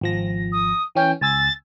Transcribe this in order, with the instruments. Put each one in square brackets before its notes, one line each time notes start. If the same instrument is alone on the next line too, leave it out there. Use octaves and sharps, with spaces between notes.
[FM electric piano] G#1 F3 A#6
[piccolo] D#6
[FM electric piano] E3 C#4 [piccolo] G5
[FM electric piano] C#2 G#5 E6 [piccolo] A6